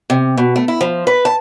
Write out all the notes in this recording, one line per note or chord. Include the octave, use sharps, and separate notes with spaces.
C3
B2
A3
E4
F3
B4
A5